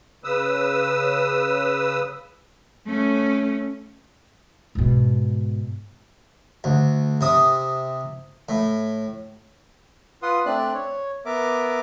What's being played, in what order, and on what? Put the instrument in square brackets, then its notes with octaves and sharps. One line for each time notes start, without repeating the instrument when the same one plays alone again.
[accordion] C#3 B4 D#6 E6
[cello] A3 C#4
[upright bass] G#2 B2
[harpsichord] D2
C3 D#6
A2
[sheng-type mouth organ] F4 B4 F#5 C6 D#6
A3 C4 D4 D5 F#6
C#5
B3 A#4 E5 D6